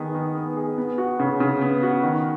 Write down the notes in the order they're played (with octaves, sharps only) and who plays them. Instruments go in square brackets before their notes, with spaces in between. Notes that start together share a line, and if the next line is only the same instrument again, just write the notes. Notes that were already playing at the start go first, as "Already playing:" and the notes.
Already playing: [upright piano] D#3 B3 G#4
D#3
B3
G#4
B3
F#4
C#3
C#3
B3
F#4
D#3